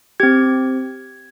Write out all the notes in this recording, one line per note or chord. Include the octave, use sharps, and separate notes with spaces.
C4 G4 G#6